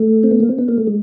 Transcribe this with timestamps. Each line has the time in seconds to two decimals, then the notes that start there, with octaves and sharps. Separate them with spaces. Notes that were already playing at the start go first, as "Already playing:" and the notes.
Already playing: A3
0.23 C4
0.31 B3
0.40 A#3
0.49 C4
0.58 B3
0.68 A#3
0.78 A3
0.87 G#3